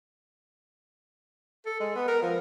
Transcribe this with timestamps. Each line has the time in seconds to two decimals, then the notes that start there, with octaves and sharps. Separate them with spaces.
1.66 A4
1.80 G#3
1.95 B3
2.08 A#4
2.22 F3